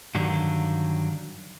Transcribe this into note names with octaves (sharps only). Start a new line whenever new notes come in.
G2 D3 D#3 F#3 D4